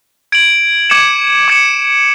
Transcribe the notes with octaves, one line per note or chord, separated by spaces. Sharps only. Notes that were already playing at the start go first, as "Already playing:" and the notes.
G#6 D7 F#7
D6 G#6 C#7 E7
D6 G#6 C#7 E7